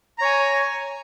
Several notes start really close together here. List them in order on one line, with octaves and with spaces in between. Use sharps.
A#5 C#5 G#5